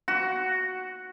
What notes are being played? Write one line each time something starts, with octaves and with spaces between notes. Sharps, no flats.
F#4